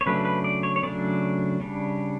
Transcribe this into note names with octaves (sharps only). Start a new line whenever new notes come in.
C#5
C#3 F#3 A3 D4 B4
B4
D5
C#5
C#5
C#3 F#3 A3 D4 D5
C#3 G3 D4